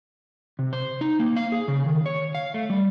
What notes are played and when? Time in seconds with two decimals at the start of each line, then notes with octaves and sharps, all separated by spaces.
0.59 C3
0.73 C5
1.01 D#4
1.19 A#3
1.36 F5
1.52 G#4
1.68 C#3
1.86 D#3
2.06 C#5
2.35 F5
2.54 A3
2.70 G3